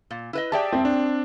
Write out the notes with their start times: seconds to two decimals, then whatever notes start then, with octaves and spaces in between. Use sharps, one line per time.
0.11 A#2
0.33 E4 B4 D#5
0.52 G4 G#4 D5 E5 G5 A5
0.72 C4
0.85 D4